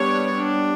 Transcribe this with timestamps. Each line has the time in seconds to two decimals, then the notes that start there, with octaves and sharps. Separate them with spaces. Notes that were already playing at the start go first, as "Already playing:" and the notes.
Already playing: G3 B3 D4 C#5
0.36 D4